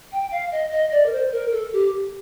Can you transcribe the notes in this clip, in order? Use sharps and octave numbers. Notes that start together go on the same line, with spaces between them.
G5
F5
D#5
D#5
D5
A#4
C5
A#4
A4
G4